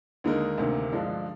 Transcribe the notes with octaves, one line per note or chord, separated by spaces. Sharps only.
D#2 D3 G#3 D#4 A#4
D2 C3 D#3 A#3
G2 D3 F3 G#3 D4